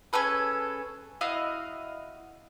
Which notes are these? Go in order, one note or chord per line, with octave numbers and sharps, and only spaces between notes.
C#4 G#4 A4 B4
E4 F#4 D#5 F5